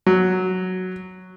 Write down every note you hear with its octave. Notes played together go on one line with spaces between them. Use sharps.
F#3